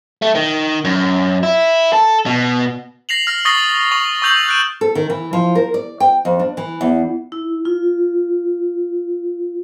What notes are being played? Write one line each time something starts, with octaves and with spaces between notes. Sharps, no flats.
A3
D#3
F#2
E4
A4
B2
A#6 C7 F7 F#7
F6 A#6
C#6 D#6 A6 A#6 C7 G7
C#6 G7
C#6 E6 G6 F7 F#7
F#6 D7 E7
A4
D#3
E3
F3
A#4
D5
G5
F2
D4
E3
E2
E4
F4